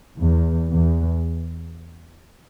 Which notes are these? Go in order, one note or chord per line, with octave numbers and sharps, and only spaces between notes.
E2
E2